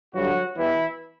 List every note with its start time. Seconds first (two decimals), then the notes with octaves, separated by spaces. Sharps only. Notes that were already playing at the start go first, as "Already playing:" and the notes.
0.15 G2 D3 F#3 G3 F#4
0.57 E2 B2 E3 G3 E4